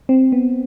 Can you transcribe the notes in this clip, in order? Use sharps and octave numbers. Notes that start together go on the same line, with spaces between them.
C4
B3